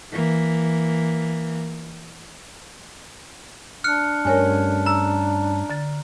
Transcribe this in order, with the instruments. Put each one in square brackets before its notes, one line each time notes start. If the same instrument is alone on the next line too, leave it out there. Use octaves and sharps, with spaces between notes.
[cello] E3 A#3
[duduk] D4 [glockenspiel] F6 F#6 C#7
[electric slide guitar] G2 A3 C#4 [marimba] A#4 C#5 G#5
[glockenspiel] A#5 [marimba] E6
[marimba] D3 A6